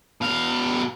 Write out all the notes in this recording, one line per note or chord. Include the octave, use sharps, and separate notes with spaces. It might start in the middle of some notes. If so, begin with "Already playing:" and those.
B2 F5